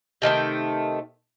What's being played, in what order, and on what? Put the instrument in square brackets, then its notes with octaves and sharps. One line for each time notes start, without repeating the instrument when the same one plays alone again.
[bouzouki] C3 D#3 A3 G5